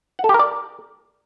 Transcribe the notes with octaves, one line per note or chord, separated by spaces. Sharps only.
F#5
A4
G4
A#4
D5